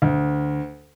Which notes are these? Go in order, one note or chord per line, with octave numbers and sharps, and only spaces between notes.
D2